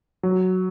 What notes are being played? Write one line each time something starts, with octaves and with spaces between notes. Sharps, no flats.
F#3